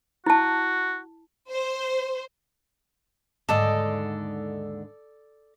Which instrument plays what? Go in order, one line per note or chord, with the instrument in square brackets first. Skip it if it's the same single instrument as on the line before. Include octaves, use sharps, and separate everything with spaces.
[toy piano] E4 A5 [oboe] F#4
[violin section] C5
[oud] D#2 G#2 D3 [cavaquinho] A4 D5 D#5